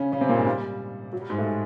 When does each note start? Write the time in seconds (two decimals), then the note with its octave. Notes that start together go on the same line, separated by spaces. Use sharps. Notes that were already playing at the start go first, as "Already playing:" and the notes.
Already playing: C#3 C#4
0.12 C#3 C#4
0.21 C3 C4
0.29 A#2 A#3
0.37 G#2 G#3
0.46 G3
1.13 F#3
1.21 G3
1.30 G#2 G#3
1.38 A2 A3
1.46 G#3